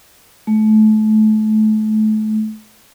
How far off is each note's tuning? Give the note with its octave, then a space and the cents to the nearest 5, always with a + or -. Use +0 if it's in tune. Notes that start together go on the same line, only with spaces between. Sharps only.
A3 -30